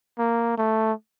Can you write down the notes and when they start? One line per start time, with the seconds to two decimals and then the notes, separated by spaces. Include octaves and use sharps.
0.19 A#3
0.58 A3